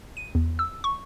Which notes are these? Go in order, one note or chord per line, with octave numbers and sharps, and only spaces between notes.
D#7
E2
E6
C#6